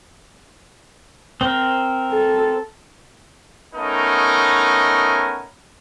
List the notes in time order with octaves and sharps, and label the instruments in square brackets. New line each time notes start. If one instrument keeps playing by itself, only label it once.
[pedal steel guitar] C4 A#4
[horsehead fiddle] A4
[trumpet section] A3 B3 C#4 D#4 A#4